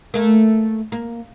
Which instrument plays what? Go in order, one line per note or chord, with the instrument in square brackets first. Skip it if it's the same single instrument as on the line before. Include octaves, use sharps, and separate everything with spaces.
[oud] A3 A#3
A#3